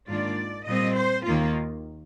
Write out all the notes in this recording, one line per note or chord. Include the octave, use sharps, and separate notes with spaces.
G#2 D#3 A#3 D4 F4 D5
A#2 G3 C4 D#5
C5
D#2 D#3 A#3 F4